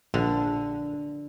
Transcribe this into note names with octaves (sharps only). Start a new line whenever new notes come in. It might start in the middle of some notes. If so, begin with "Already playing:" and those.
A#1 D3